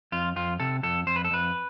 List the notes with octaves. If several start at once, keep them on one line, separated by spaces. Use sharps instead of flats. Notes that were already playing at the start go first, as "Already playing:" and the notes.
F2 F4
F2 F4
C3 A4
F2 A4
F2 C5
B4
A4
F2 B4